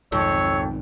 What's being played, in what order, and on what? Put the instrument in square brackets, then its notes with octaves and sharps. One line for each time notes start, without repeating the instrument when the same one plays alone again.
[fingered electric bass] B1 G#2 D#3 [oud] F2 [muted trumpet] C#5 [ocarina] E6